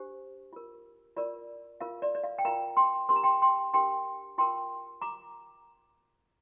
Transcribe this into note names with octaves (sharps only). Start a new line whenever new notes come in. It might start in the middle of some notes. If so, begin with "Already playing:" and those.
Already playing: D4 G4 C5
F4 A#4
F4 A#4 D5
F4 A#4 F5
D5
D5
F5
G5
F4 A#4 F5 A#5
G5 C6
D4 G4 A#4 C6
A#5
G5 C6
G5 C6
D4 G4 A#4 G5 C6
F4 A#4 G5 C6
A#5 D6